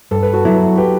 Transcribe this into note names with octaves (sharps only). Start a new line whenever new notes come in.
G2 A4
B4
F#4 A4
F#3 B3 E4
G4 B4